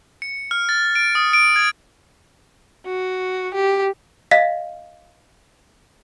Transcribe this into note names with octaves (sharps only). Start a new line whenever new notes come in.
C#7
F6
A6
D7
D#6
D7
G#6
F#4
G4
D#5 F5 B6